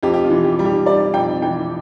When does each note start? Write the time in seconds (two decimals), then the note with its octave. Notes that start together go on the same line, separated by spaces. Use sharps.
0.03 F2 G4
0.14 G4
0.24 F4
0.31 E3
0.44 G4
0.59 G3
0.65 G4
0.86 G3 D5
1.14 F2 G5
1.42 E3 G5